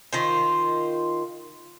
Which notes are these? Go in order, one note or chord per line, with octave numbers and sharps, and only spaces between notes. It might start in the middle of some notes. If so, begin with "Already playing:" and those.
D#3 F4 C5